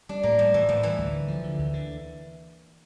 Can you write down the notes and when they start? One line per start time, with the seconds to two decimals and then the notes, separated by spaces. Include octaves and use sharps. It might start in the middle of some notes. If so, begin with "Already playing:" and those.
0.09 G3 D4
0.23 A2 A#3
0.38 F3 G3
0.54 A2 E3
0.69 A2 F3
0.83 E3 G3
0.98 D2
1.13 D3
1.28 F3
1.43 D3
1.59 D2
1.73 D3